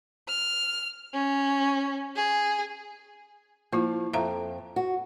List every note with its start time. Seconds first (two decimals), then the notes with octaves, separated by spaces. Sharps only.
0.28 F6
1.13 C#4
2.16 G#4
3.72 F3 A#3 E4 F4
4.13 F2 E5 F5 A#5
4.76 F#4